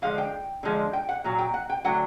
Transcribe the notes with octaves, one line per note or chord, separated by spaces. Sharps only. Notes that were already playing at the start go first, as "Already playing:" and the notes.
D3 F3 G#3 F5
G5
D3 F3 G#3
G5
F#5
A#2 F#3
G5
F#5
G5
D3 F#3 A3 F#5